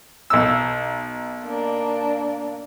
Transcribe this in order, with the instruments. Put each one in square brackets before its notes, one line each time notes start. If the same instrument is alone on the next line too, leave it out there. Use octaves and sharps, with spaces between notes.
[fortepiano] B1 E6
[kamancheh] A#3 D4